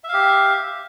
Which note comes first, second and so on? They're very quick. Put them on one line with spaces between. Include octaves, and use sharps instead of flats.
E5 F5 G4